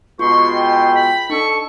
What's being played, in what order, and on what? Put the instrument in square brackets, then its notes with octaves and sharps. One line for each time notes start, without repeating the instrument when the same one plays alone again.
[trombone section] B2 G#3 [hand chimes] F4 [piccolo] C6 [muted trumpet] C#6
[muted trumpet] G5
[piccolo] B5
[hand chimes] D4 D#4 [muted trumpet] A4 [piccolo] C#6